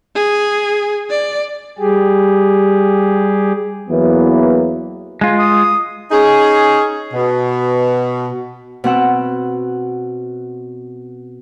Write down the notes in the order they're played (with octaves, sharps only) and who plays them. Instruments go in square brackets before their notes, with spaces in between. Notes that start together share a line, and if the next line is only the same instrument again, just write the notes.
[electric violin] G#4
D5
[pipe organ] G3 G4 G#4
[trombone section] E2 E3 F#3 A#3 B3
[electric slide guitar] G#3 F4
[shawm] D#6
[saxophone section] C#4 D#4 G#4
B2
[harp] B2 C4 F#5 E6